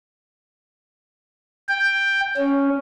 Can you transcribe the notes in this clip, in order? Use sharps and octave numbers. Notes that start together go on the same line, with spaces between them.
G5
C#4